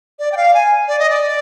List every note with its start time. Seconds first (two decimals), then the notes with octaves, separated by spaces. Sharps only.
0.19 D5
0.32 G5
0.37 F5
0.54 G#5
0.88 D5
0.99 D#5
1.10 D5